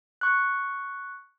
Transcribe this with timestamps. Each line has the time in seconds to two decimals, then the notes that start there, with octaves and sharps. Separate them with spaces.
0.21 C#6 F#6